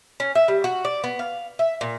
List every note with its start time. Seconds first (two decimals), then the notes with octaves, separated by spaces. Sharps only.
0.20 C#4
0.35 E5
0.48 G3
0.64 F#4
0.85 D5
1.04 B3
1.19 F5
1.59 E5
1.81 A#2